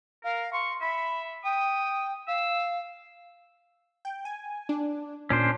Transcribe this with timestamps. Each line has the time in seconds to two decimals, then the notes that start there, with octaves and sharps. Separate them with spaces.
0.24 A#4 F5
0.53 C6 C#6
0.81 E5 B5
1.44 G5 D#6
2.28 F5 E6
4.05 G5
4.25 G#5
4.69 D4
5.30 A#2 C#4 D4 C5